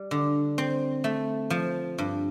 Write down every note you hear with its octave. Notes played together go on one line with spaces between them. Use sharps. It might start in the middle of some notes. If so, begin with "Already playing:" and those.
Already playing: G3
D3
C4
A3
F3
G2